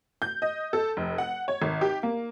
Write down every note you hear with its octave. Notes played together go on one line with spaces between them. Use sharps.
G6
D#5
A4
F1
F#5
C#5
G#1
G4
A#3